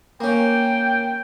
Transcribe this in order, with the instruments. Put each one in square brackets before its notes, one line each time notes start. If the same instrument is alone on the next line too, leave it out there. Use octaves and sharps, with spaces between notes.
[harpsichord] A#3 C#4 [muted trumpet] G5